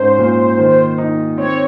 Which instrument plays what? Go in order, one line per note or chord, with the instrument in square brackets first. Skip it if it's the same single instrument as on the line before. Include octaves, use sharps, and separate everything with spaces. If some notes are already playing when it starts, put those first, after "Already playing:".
Already playing: [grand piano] G#2 C#4 [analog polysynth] C5
[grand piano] A#2
D#3
D#4
[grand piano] C4 [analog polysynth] C#5